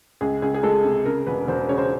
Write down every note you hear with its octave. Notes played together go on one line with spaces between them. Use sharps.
C#2 G#4
C#2 G#4
G#4
G#3 A4
C3
C#3 A#4
E1 B4
E1 C5
C#3 C#5
C5